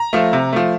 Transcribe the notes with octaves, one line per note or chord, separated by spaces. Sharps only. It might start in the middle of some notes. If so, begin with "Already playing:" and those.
Already playing: A#5
F3 A3
C3
F3 A3